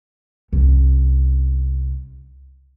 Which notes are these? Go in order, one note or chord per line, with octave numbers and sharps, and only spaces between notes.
C2 C#4